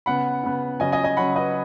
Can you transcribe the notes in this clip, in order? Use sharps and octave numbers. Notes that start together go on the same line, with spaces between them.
C#3 B3 F#5 B5
C#3 B3
C#3 F#3 C#4 D#5 G#5
D#5 G#5
D#5 G#5
C#3 F#3 C#4 F#5 B5
B4 D#5